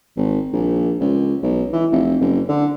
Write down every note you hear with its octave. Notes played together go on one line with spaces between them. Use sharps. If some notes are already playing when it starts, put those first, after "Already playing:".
G#1
A#1
C#2
B1
E3
F1
F#1
D3